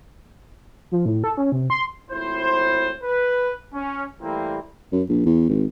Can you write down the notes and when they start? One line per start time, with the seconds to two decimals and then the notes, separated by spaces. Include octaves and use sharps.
0.92 F3
1.06 A2
1.24 A4
1.37 C#4
1.52 C3
1.70 C6
2.10 G#1 A2 E4 C5
3.03 B4
3.73 C#4
4.21 E3 G3 A3 A#3 C4
4.92 F#2
5.09 A#1
5.26 E2
5.49 G#1